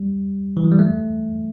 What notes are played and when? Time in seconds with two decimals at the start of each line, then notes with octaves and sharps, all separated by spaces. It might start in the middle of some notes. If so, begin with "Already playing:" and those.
Already playing: G3
0.57 E3
0.64 F#3
0.72 G3
0.79 A3